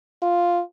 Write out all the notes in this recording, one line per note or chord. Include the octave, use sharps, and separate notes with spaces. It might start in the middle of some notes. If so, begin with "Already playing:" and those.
F4